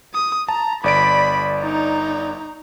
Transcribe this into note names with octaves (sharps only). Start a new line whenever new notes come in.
D#6
A5 A#5
G1 D5 B5 D7
D#4 A#5